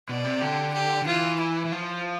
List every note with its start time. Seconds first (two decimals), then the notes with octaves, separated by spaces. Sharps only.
0.09 B2 D5
0.25 C3
0.41 D3 G4
0.73 G4
1.02 D3
1.06 E3 F4
1.40 E4
1.65 E3
1.72 F3 F4